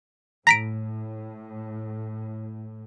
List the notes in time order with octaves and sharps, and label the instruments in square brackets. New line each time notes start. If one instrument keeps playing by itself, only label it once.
[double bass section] A2 [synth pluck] A#5 [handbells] A#6 B6 D7